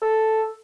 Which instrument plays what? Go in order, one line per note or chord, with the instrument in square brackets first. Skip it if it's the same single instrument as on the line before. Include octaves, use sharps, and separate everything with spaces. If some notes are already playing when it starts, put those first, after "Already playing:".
[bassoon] A4